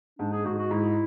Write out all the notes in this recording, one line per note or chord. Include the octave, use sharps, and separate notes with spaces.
G#2 D4
G#4
G#2 F#4
F#4
G#2 E4